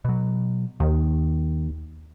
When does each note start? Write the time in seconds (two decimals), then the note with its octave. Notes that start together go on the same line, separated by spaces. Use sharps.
0.05 B2 F#3
0.80 D#2 D#3